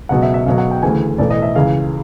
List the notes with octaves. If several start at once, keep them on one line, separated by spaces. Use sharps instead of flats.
C#2 B2 F#3 F#5
E5
E5
B1 B2 F#3 F5
F#5
G5
D2 C#3 E3 G#5
B1 A2 E3 D5
D#5
E5
C#2 C#3 E3 F5